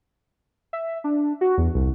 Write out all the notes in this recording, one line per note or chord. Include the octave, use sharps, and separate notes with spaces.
E5
D4
F#4
E2
C2